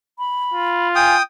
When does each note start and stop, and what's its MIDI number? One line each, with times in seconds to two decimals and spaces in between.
0.19 0.88 83
0.54 1.20 65
0.96 1.22 79
0.96 1.15 80
0.96 1.22 87